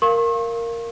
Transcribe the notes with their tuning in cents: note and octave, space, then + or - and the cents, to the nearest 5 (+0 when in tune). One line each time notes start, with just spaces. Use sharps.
A#4 -5 F5 -10 C#6 -45